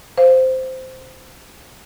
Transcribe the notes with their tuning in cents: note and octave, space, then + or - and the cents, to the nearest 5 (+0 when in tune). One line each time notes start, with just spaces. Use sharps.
C5 -10 F5 +0